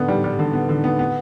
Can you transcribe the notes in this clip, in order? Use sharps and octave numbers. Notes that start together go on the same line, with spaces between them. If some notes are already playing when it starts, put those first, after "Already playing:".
Already playing: D3 B3
G3
G3
D3
B3
D3
B3
B3